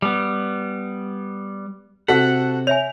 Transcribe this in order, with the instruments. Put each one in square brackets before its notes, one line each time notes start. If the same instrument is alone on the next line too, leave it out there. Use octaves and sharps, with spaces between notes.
[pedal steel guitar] G3 B3
[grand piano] C3 B6 [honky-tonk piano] F#4 A4 [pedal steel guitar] F#5
[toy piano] C#5 E5 G#5 [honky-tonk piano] F7